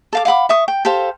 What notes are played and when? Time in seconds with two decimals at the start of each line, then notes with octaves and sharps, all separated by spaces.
0.13 A4 F5 D6
0.25 F5 F#5 B5 D6
0.49 E5 C#6 D#6
0.68 G5
0.85 G4 A4 C5 F5